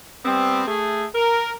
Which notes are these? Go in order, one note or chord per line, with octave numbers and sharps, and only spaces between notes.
G3 B3 C4
A3 G#4
A#4